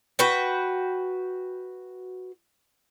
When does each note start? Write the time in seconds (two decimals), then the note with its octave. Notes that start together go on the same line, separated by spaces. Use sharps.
0.19 F#4 B4 G5